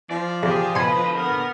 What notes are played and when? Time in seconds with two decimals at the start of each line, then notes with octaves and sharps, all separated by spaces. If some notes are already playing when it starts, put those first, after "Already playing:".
0.10 F3 D5
0.43 E2 G4 G#4
0.75 D3 B4 D#5 G#5 B5 C6
1.17 B3 A#4